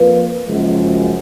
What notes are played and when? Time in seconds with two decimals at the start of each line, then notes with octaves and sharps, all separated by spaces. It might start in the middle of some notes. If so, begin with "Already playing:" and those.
Already playing: F2 F3 A#3 F4 B4
0.46 F#1 F#2 F3 G#3